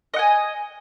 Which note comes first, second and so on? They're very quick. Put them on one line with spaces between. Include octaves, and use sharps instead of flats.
D#5 F#5 G#5